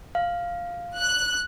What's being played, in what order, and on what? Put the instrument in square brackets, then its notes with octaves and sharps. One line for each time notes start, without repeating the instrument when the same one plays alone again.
[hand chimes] F5
[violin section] F#6